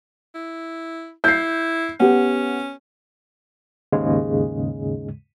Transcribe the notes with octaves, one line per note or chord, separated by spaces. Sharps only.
E4
E4 G6 C7
B3 C#4 G4 B4
D#2 G#2 C#3 G#3